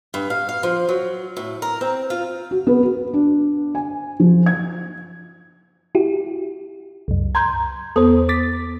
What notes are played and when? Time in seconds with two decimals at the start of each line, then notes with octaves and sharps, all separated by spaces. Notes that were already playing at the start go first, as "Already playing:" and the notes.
0.14 G2
0.30 F5
0.49 F5
0.63 F3
0.89 F#3
1.37 A2
1.62 A#4
1.81 C4
2.10 F4
2.51 F#4
2.67 B3
2.83 F#4
3.14 D4
3.75 G#5
4.20 F3
4.46 G#6
5.95 E4 F#4 G4
7.08 C2 F#2
7.35 A#5 C6 G6 G#6
7.96 E2 B3 A4 C5 D#6
8.29 D6 A6 B6